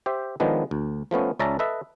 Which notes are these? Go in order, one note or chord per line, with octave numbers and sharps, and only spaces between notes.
G4 C5 E5
D#3 F3 G#3 B3 D4
D2
F3 A3 B3 C#4
C#2 C#4 D5 E5 A5 A#5
A4 B4 D#5 E5